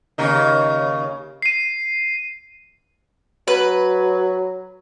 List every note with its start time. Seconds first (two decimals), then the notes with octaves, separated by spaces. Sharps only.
0.18 D#2 C#3 D#4
1.42 C7 D#7
3.48 F#3 B4